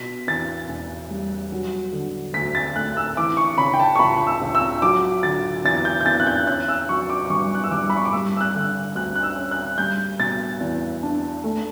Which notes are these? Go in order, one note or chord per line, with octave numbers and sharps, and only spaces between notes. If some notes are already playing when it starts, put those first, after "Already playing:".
Already playing: B2 B6
E2 A6
E1
G3
F#3
D3
D2 B6
A6
A3 F#6
E6
E3 D6
C#6
C#3 B5
G5
A5
C#6
C#2 B5
E6
C#2
E6
F#3 D6
D3 A6
E2 A6
G6
G6
E2 A6
F#6
G6
C#4 F#6
E6
F#3 C#6
D6
D6
G2 C#6
F#6
E6
G2 D6
B5
C#6
D6
G3 E6
E6
F#6
D3
D2 F#6
F#6
E6
C#4
F#6
G3 G6
B2 A6
E2
D4
A3